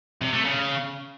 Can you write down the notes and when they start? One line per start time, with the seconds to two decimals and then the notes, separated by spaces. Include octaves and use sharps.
0.22 C3
0.33 A3
0.44 C#3